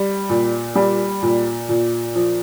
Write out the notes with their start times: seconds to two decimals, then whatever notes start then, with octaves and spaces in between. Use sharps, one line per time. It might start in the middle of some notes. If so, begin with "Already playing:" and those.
Already playing: G3
0.29 A#2
0.75 G3
1.22 A#2
1.69 A#2
2.15 F3